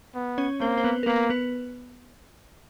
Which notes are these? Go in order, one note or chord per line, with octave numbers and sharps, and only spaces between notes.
B3
C#4 C#5
A#3 C4 C5
C5
B3 B4
A#4
A#3 B3 B4
B3 B4